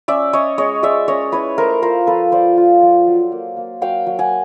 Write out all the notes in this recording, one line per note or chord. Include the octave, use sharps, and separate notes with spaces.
C#4 D5 E5
C#4 C#5 D#5
G#3 C#5 D#5
G#3 D5 E5
C#4 C#5 D#5
E4 B4 C#5
A3 A#4 C5
F4 A#4 C5
F3 A4 B4
F4 C5 D5
F4
F3
F#3
A#3
A#3
F#3 F5 G5
F#3
F#5 G#5